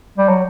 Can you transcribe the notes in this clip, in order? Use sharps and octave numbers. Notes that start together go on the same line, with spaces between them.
G3
F#3